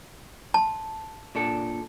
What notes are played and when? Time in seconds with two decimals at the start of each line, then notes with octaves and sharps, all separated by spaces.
0.54 A5 C6
1.35 A#2 D4 A4